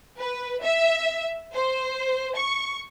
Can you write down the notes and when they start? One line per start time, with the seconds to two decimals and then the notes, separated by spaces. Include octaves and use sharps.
0.19 B4
0.62 E5
1.54 C5
2.35 C#6